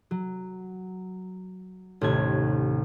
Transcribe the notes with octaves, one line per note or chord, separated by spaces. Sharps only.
F#3
A1 D#2 C3 G#6